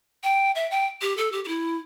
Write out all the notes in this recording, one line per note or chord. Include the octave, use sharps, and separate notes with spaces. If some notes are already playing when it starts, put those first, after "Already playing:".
G5
E5
G5
G4
A4
G4
G4
E4